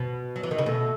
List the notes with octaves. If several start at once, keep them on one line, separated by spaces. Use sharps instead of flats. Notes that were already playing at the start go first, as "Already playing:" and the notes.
Already playing: B2
F#3
E3
D#3
C#3
B2 F#4 A4 E5